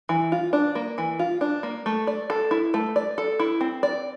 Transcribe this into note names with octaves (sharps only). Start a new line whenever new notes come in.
E3
F4
D4
A#3
E3
F4
D4
A#3
A3
D5
A4
E4
A3
D5
A4
E4
C4
D5